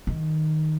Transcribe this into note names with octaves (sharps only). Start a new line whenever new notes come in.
D#3